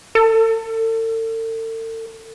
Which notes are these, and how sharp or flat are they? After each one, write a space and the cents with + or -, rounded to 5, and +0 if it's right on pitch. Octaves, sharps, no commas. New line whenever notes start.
A4 +40